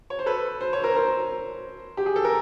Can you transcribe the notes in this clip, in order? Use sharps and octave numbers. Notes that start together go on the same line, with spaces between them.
C#5
C5
A4 B4
C5
C#5
A#4 C5
A#4 C5
G4
G#4
A4
A#4